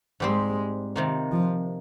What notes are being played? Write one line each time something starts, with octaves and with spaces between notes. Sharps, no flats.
G#2 G3 G#3 C4 G4 C5
C3 D#3 A#3 F4
F3